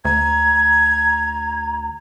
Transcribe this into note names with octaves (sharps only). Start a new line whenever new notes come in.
D2 A#5 G#6